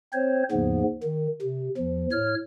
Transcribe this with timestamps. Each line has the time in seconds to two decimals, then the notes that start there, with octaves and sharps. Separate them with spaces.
0.13 C4 C5 C#5
0.51 D#2 G#2 C#3 F3 B3
1.04 D#3
1.42 C3
1.78 E2 F3
2.12 A2 C#5 F6